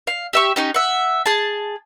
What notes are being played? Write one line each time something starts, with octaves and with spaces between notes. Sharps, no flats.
F5
G4 E5 C#6
C#4 D#4 G4
E5 F#5
G#4 A5